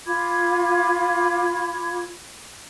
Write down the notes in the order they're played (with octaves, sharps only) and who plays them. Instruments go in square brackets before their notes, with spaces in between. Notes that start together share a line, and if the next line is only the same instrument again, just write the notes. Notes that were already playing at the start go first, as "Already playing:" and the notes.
[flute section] F4 B5 D6 G#6